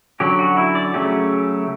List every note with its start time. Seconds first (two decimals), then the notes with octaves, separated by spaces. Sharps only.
0.20 D3 F#3 C#4 G4
0.39 F#4
0.57 E4
0.75 D5
0.94 C#3 F#3 A3 C#4 G4